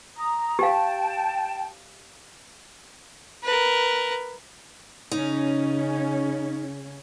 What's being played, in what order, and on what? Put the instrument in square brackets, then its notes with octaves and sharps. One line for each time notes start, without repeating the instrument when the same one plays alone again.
[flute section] A#5 D#6
[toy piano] G4 F5 [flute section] G5 A5
[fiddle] A#4 B4
[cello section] C#3 C#4 [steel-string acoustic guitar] D#4